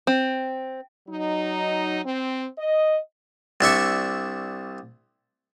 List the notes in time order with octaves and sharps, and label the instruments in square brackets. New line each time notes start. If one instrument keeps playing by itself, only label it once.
[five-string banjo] C4
[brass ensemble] F#3 D#4
C4
D#5
[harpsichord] C2 D4 E5 C#6